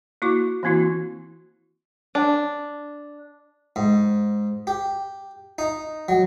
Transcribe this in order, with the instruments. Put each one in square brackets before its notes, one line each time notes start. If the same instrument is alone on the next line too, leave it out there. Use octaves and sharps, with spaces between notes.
[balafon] A#3 E4 F#4 C#6 D6
E3 A#3 C4 E4 F#4
[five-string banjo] D4
[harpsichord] G#2
G4
D#4
F#3